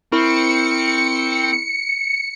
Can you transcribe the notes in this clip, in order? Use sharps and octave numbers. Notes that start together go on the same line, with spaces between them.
C4 E4 A#4 C#6 C#7